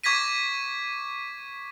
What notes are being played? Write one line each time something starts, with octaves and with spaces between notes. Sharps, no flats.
C#6 D6 G#6 A#6 B6 D#7